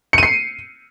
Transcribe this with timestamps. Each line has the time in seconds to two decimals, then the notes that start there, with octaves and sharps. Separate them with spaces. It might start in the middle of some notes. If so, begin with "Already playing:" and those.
0.13 C#7
0.18 D#7
0.23 C7